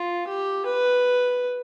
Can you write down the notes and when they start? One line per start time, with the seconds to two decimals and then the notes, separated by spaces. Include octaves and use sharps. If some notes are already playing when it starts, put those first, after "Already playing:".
Already playing: F4
0.27 G4
0.66 B4